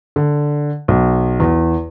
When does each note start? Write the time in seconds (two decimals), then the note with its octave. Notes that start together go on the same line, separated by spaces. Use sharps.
0.16 D3
0.88 B1
1.40 E2